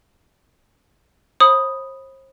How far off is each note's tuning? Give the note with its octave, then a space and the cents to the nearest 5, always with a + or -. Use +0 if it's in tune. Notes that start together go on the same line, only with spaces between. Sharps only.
C5 +40 B5 +0 D#6 +0